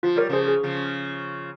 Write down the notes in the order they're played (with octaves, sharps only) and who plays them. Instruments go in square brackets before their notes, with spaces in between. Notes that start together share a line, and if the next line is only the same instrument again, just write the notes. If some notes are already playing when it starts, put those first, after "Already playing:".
[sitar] F3 [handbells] F4
[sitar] G3 [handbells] A#4 C#5
[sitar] C#3 F3 [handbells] G#4 C5
[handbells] G#4
[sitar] C#3 F3